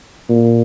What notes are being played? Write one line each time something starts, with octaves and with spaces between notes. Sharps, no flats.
A#2